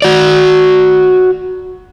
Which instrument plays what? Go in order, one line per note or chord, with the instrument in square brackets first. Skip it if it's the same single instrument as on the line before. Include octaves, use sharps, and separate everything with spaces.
[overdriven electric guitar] F#4 D5